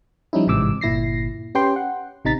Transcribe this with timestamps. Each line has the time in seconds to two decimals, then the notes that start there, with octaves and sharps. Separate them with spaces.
0.33 F3 G3 C#4 D#4 E4
0.47 A1 G#2 C3 E3 D6 E6
0.81 G1 A#2 E4 A#6 C7
1.55 C#4 G4 B4 G5 C6
1.76 F#5
2.25 A1 C3 D#4 A#5 A6 B6